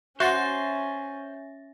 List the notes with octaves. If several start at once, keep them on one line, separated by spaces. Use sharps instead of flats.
C#4 F#4 C5 E5 A6 A#6